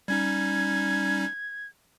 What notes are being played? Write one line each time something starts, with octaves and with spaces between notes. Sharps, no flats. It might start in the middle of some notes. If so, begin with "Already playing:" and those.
G3 C#4 D#4 G#6